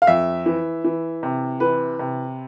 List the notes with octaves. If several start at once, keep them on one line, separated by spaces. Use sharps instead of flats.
F5
F2 E5
E3
E3
C3
E3 B4
C3